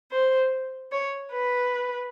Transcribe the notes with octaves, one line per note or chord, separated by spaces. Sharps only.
C5
C#5
B4